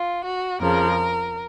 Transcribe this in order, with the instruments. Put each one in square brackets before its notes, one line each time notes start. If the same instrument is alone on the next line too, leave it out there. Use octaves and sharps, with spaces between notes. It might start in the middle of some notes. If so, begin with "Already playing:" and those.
Already playing: [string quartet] F4
F#4
F2 C#3 F3 A#4